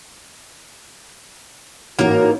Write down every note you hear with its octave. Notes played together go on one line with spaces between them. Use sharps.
A1 G#2 A#3 F#4 A#4